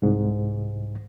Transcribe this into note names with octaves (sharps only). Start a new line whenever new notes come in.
C2 G#2